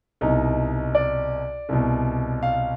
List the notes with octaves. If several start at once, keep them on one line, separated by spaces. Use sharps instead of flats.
C2 B2 D#4
D5
C2 B2
F5